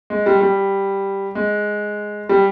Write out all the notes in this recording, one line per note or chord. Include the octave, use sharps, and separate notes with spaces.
G#3
G3
G3
G#3
G3